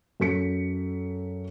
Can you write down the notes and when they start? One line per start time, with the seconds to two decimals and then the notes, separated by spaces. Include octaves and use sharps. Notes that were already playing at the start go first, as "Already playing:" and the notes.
0.20 F#2 A4 B6 C#7